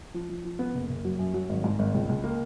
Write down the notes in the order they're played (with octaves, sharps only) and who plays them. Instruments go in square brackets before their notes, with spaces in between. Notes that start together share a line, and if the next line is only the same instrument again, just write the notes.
[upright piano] F3
F3
F3
B3
F#1
F#1
F#3
F#2
F#3
G#1
G#2
G#1
C#2
C#2
A#3